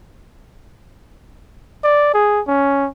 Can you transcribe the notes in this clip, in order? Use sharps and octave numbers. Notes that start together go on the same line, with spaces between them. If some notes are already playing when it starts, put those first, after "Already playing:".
D5
G#4
C#4